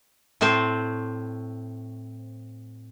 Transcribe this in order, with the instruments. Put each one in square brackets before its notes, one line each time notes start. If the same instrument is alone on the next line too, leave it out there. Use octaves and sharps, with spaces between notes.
[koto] A2 A3 C4 C5